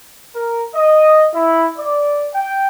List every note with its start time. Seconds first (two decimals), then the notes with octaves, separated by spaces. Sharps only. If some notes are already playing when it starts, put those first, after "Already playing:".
0.35 A#4
0.75 D#5
1.34 E4
1.77 D5
2.34 G5